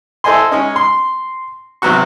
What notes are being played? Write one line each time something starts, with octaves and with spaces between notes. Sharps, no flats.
E4 A4 C5 D#5 G#5 C6
G#3 C#4 D#4
C6
G#1 C3 F#3 B3 F#4 C#6